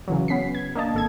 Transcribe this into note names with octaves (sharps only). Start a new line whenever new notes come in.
C#3 E3 F#3
B3 C#4 B6 C7
G#6
A#3 D4 D#5 A5
G#1 A4 G#6